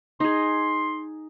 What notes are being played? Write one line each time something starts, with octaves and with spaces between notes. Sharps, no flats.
D#4 G#4 C6